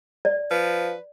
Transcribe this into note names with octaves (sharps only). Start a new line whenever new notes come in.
D5
F3 B4